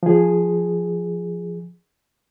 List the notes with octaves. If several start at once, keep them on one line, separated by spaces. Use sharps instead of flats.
F3 G#4